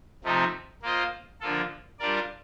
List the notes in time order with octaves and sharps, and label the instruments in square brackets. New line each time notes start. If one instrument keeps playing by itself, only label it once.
[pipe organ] C3 F3 A3 C4 D#4
A#3 F4 C5 D#5
D3 F3 A#3 F4 A4
G3 D4 F4 A#4 D5